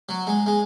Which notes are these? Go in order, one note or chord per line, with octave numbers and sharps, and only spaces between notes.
F#3
G#3
G#3